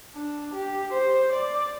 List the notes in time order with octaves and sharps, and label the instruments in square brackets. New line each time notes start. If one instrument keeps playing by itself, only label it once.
[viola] D4
G4
C5
D5